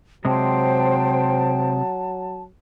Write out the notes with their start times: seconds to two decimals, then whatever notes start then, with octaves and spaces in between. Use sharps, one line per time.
0.25 C3 F#3 G#3 C5 G5 A5